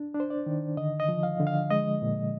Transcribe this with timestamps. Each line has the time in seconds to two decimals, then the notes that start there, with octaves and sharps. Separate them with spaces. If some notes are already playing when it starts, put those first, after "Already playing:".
Already playing: D4
0.14 D4
0.20 C5
0.30 D5
0.46 D#3
0.77 D3 D#5
1.00 D#5
1.09 F3
1.23 F5
1.40 D3
1.47 F5
1.70 G#3 D#5
2.02 A#2